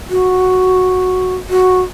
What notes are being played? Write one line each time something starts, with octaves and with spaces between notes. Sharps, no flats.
F#4
F#4